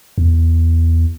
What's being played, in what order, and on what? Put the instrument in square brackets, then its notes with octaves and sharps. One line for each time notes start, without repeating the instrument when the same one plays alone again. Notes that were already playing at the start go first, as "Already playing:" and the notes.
[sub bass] E2